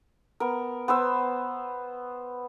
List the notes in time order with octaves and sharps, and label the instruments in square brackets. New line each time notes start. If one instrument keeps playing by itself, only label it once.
[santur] B3 A#4
B3 C5 E6